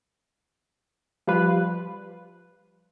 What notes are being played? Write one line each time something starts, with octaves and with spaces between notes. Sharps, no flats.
F3 G3 F4 B4